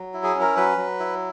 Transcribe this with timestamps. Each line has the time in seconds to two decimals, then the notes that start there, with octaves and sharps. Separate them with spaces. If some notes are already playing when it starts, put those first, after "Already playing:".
Already playing: F#3
0.14 E4
0.24 G#4
0.35 C#4
0.40 A#4
0.56 F#3 B4
0.78 F#3
1.00 E4